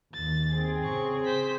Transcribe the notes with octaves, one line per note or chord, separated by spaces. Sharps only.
D#2 A6
C4 G#4
C#3 C#6
C5 B6